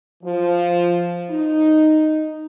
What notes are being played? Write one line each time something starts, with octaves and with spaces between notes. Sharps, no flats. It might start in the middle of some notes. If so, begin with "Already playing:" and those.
F3
D#4